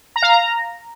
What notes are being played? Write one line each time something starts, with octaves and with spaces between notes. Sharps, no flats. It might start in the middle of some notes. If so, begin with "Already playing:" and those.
A#5
F5
A#5